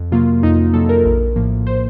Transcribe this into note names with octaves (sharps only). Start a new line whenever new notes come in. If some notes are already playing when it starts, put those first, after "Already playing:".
Already playing: F2
C3 F#3 A#3 F4
F2 D#4
C3 F#3 A#3 A4
A#4
A#1
A2 F3 A#3
C5